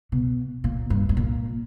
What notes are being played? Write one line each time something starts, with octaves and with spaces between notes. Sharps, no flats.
B2
A#2
G2
G2
A#2